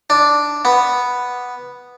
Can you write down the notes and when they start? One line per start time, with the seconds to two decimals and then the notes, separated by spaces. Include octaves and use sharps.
0.10 D4
0.65 B3